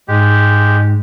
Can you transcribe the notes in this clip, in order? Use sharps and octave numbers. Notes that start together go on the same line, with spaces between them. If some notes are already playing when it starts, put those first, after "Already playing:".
G#2 G#3 G4